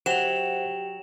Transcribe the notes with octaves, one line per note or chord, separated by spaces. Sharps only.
F#3 G4 C5 E5 F#5 G5 E7 F7